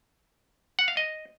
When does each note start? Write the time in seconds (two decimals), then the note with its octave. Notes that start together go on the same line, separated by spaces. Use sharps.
0.79 F#5
0.88 F5
0.97 D#5